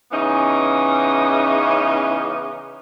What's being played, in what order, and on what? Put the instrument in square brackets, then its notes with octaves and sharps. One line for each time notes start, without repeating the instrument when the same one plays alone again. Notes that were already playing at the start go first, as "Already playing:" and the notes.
[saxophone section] C#3 E3 B3 C#4 D#4